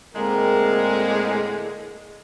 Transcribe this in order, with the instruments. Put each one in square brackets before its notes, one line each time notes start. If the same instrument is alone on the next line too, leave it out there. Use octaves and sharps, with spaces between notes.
[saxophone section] A2 D3 G#3 [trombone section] A#3 C4 A#4